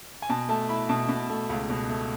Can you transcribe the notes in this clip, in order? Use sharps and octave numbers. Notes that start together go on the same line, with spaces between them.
G#5
B2 A5
A3 A5
E4 B5
B2 A5
B2
A3
C#2
B2
A3